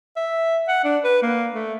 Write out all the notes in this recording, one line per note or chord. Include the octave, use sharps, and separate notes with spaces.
E5
F#5
D4
B4
A#3
A3